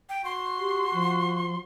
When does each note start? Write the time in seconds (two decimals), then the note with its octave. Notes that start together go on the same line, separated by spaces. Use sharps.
0.09 G5
0.25 F#4 C6
0.59 G4
0.93 F3